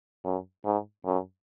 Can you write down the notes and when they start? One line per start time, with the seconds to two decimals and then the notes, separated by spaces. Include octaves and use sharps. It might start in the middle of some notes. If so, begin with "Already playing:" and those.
0.24 F#2
0.65 G#2
1.05 F#2